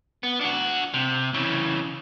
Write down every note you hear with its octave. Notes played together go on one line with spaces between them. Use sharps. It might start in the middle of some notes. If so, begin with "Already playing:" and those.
B3
D4 F#4
C3
C#3 E3